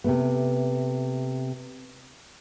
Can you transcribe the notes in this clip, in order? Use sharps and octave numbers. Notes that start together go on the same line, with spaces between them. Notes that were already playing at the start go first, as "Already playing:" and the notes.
C3 A3 B3